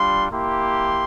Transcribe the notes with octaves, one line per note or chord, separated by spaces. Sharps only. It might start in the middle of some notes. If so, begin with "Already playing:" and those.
Already playing: G3 D4 F4 C6
A#3 E4 G4 C6